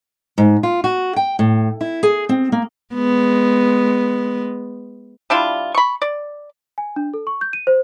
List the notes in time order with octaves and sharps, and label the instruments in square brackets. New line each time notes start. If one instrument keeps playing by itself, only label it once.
[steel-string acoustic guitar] G#2
F4
F#4
G5
A2
E4
G#4
C4
A#3
[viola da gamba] G#3 B3
[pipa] G3 D4 E4 F4
B5 C#6
D5
[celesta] G#5
D4
A4
C#6
G6
D#7
C5